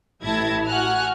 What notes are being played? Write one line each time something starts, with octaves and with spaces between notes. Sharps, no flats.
A1 A2 E4 A5 G#6 A#6
F#4 F#5 G#5 F6 F#6